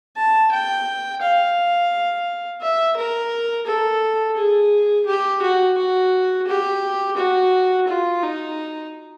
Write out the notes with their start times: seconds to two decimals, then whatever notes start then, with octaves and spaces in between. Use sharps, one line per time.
0.16 A5
0.52 G5
1.22 F5
2.61 E5
2.97 A#4
3.67 A4
4.38 G#4
5.07 G4
5.42 F#4
5.78 F#4
6.47 G4
7.17 F#4
7.88 F4
8.23 D#4